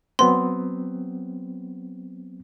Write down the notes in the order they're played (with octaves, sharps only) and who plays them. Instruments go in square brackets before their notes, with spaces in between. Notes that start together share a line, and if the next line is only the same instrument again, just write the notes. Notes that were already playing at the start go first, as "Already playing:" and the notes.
[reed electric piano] F#3 B3 C4 [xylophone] C6